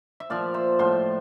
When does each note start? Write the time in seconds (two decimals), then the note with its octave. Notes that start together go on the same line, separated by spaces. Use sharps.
0.20 E5
0.30 A#2 F3 D5 F5
0.54 C5 E5
0.79 A2 F3 C5 E5